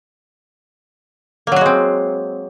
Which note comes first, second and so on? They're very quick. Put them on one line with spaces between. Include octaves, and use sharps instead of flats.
A#3 F#3 F#4 G#3 C4